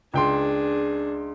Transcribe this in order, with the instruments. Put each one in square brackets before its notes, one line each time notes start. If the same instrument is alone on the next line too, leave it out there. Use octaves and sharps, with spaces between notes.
[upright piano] C#2 G5 C6 [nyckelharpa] D4 G#4